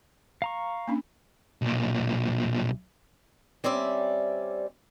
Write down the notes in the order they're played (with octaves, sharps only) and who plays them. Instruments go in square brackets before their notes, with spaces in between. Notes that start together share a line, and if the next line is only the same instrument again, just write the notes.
[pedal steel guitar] F5 A#5 C#6
[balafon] A#3 C#4 D4
[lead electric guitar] B1 A#2
[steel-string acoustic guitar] G3 C4 C#4 D5 E5